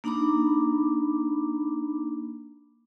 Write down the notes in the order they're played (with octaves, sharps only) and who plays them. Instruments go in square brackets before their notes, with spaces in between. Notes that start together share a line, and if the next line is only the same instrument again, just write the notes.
[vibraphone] A#3 D4 D#4 A#5 B5 D6